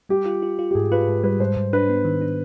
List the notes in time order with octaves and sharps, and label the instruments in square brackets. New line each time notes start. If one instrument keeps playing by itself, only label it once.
[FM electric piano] G3 [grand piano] G4
[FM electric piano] F4
F4
F4
[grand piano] G4
[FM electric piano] G#2 [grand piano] G#4
[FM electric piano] F4 [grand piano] B4
[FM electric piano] G#2
[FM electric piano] G3 [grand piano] B4
[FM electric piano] G#2 [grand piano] C5
[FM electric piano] G#2
[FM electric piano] D4 [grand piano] B4
[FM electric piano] B3
D#3
D4